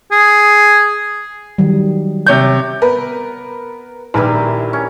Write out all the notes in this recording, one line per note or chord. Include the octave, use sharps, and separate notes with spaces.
G#4
D#3 F#3 G3
C3 C#5 G6
B3 A#4 B4
A#1 D#3 G3 E4 A#4 B4
C#4